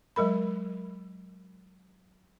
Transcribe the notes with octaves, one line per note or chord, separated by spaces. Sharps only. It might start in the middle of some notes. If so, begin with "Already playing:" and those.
F#3 G#3 A#4 B5